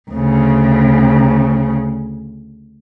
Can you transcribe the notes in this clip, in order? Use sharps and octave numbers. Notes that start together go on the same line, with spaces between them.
D2 C#3